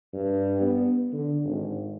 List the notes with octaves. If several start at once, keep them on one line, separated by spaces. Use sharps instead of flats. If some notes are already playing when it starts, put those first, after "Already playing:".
G2
B3
D3
G#1